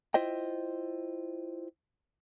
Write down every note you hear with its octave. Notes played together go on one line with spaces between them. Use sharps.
E4 F4 C5 D#5 G5